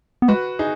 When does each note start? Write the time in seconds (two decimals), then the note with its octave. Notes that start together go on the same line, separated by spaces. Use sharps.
0.22 B3
0.28 G#3 F#4 B4
0.59 D#4 G#4